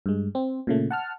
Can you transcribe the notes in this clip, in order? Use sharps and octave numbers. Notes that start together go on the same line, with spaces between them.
G2 G#3
C4
A#2 C#3 A3
F#5 A5 F6